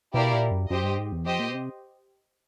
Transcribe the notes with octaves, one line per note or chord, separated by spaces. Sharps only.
B2 E4 G4 A#4 D5 F5
A#2
F#2
F#2 G4 C5 D#5
G2
G#2
E2
F2 G4 C5 D#5
A#2
B2
C3